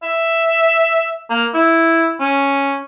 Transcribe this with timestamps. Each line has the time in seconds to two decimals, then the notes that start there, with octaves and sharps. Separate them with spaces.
0.03 E5
1.30 A#3
1.54 E4
2.20 C#4